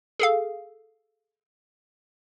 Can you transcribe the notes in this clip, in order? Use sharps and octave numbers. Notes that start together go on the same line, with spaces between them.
G#4 A4 F5